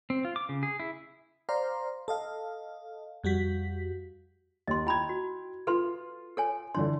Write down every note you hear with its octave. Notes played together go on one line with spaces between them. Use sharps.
C4
F4
D6
C#3
G#4
E4
C5 D5 F5 A#5 C6
A4 D#5 F5
F2 G3 F#4 B6
D#2 D#5 C6
E4 G5 B5 G#6
F#4
F4 A4 B4 C6
A4 C#5 G#5
D3 E3 D4 C#5 C6